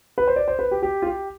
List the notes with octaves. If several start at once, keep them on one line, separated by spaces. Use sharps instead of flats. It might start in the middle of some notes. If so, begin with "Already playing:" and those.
B4
C5
D5
C5
B4
G4
G4
F4
G4